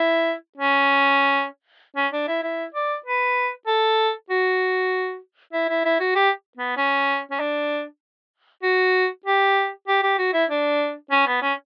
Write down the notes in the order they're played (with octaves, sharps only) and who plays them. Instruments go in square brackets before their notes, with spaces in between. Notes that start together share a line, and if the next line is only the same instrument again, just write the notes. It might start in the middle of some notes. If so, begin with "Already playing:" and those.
Already playing: [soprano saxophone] E4
C#4
C#4
D4
E4
E4
D5
B4
A4
F#4
E4
E4
E4
F#4
G4
B3
C#4
C#4
D4
F#4
G4
G4
G4
F#4
E4
D4
C#4
B3
C#4